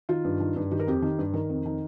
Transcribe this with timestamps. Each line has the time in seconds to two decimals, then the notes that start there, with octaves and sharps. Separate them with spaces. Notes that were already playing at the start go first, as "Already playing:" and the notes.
0.09 D#3 F4
0.24 G2
0.40 D#3
0.56 G2
0.71 D#3 G4
0.80 A#4
0.87 F2 G4
1.02 D#3
1.19 G2
1.34 D#3 A#4
1.49 F2
1.66 D#3